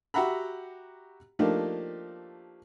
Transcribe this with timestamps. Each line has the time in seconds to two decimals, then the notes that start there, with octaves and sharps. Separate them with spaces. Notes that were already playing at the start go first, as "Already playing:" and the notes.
0.14 F#4 G4 E5 F#5 A#5 B5
1.39 F3 A3 A#3 D4 D#4 G4